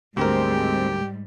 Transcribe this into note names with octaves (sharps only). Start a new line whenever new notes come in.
D2 G#2 G3 G#3 C4 G4 A#4